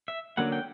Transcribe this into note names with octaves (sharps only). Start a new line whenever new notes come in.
E5
D3 F#3 A#3 C#4 F#5
G5